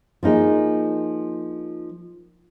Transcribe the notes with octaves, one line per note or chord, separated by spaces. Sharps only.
F3 A#3 D#4 G#4